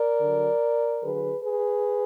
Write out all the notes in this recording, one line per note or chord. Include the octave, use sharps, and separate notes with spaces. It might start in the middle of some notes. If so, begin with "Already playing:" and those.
Already playing: A#4 D5
D3
F#3
D3 F#3 G#4 B4
G#4 B4